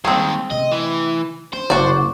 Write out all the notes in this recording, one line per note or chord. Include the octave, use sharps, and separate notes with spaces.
D#2 D#3 G3 G#3 C4 G#4
C3 A3 D#5
E3
D4 C5
F#1 C3 F#4 D5